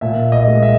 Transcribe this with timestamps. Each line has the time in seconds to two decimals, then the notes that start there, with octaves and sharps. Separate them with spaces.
0.01 A#2 E5
0.32 D#5
0.47 G#3
0.62 E5